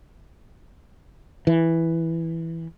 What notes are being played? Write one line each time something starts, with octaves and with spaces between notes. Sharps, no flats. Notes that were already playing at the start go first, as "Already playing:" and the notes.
E3